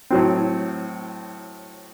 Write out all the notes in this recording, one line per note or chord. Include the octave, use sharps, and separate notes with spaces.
A2 F#3 C4